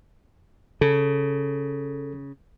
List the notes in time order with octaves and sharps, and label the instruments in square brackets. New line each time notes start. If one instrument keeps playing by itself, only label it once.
[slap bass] C#3 [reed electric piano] A4